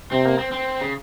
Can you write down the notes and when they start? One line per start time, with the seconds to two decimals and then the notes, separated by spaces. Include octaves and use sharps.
0.12 C3 C4
0.25 A#3
0.39 C4
0.52 C4
0.81 C#3